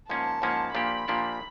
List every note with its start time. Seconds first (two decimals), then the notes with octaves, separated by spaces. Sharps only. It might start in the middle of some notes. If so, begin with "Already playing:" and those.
0.10 G#2 F3 A#3 C#4 A5
0.42 G#2 F3 A#3 C#4
0.75 A#2 F3 A#3 D4 G4 B5
1.08 A#2 F3 A#3 D4 G4